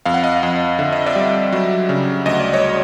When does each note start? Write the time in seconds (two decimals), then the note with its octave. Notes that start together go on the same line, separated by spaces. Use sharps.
0.05 F2 F5
0.14 F#5
0.24 D#5 F5
0.43 F2
0.79 D3 E5
0.93 D#5
1.06 D5 E5
1.16 G3
1.52 F#3
1.89 C#3
2.26 D2 D#5
2.40 D5
2.53 C#5 D#5